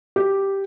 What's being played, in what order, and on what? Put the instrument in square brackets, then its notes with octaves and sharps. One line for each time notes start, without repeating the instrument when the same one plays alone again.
[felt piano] G4